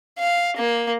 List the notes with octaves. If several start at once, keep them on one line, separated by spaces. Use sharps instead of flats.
F5
A#3